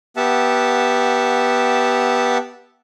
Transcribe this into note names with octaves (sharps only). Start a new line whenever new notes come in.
B3 G4 E5 F#5 A5